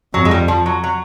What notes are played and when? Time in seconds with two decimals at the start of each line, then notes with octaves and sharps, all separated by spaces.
0.14 F2 F#3
0.25 G#3
0.31 G3
0.48 F3
0.66 F#3
0.84 F#3